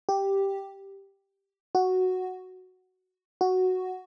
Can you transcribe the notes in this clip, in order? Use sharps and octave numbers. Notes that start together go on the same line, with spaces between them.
G4
F#4
F#4